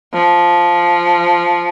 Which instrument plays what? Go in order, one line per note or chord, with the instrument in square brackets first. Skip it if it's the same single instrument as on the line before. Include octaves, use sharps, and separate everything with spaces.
[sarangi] F3